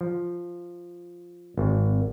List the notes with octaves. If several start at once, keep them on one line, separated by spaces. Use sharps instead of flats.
F3
G#1